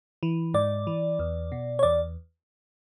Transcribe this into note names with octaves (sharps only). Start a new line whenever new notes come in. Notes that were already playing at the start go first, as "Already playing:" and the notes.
E3
G#2 D5
E3
E2
B2
C#5
E2 D5